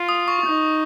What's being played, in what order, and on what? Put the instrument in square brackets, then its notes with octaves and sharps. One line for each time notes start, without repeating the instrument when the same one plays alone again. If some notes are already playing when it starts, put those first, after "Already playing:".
Already playing: [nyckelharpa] F4
[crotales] D#6
C#6
[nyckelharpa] D#4